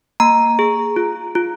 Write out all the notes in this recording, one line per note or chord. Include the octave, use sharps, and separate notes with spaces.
A#3 A#5
G#4
F4
F4